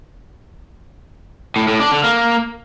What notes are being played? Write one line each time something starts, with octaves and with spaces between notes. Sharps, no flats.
A2
A2
D4
D3
A#3